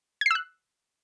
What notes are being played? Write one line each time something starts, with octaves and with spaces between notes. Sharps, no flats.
E6 F#6 G#6 C7